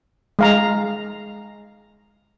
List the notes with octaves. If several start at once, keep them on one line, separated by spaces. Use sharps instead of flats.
G#3 F5 A#5